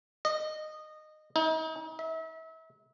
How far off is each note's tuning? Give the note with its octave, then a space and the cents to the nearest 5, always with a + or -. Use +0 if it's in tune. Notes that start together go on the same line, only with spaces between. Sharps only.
D#5 -15
D#4 +40
E5 -35